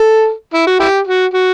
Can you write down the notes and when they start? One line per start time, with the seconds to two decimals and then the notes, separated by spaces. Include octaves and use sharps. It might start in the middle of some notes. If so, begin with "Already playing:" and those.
Already playing: A4
0.54 E4
0.67 F#4
0.80 E4 G4
1.07 F#4
1.34 F#4